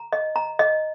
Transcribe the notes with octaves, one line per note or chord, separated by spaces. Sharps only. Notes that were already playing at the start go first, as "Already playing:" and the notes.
Already playing: A#5
D#5
A#5
D#5